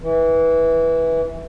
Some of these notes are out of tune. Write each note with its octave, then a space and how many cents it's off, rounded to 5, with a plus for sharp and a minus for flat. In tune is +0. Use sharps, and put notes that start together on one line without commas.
E3 -10